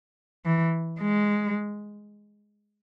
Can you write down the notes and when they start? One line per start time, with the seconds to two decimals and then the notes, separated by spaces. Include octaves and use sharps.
0.46 E3
1.01 G#3